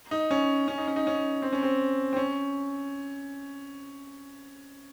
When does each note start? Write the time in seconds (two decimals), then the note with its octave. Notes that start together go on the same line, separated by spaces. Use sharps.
0.11 D#4
0.31 C#4
0.68 C#4
0.78 D#4
0.88 C#4
0.96 D#4
1.07 C#4
1.42 C4
1.53 C#4
1.63 C4
2.13 C4
2.17 C#4